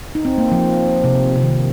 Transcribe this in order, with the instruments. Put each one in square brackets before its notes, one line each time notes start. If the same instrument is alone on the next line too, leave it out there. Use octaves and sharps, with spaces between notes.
[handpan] D#4
C4
A#3
F3
C3
C3
D#3